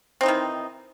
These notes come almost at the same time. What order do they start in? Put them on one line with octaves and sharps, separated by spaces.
C4 D#4 E3 D#3